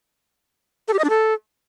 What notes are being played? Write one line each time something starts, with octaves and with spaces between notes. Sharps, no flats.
A4
G4
D#5
D4
A4